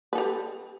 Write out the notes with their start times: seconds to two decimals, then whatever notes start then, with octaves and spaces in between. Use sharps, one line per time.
0.13 B4
0.15 A4
0.18 G4